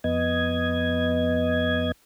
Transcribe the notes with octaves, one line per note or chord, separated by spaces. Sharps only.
F2 B3 D#5 G#6